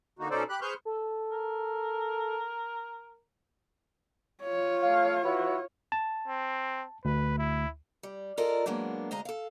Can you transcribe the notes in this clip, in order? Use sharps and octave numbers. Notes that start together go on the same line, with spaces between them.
D3 A#3 D#4 F#4
B2 C#4 D#4 A4 C5 D5
G4 B5 F#6
G#4 B4 C5 C#6 F6 G6
A4
A#4
F4 C#5
A3 F5
E4 F#4 B4
A5
C4
D2 B4
E4
G3
F4 A4 A#4 D5 D#5
F#3 G#3 A#3 B3 D4
D2 G#3 D#5 F5 A#5
A4 F5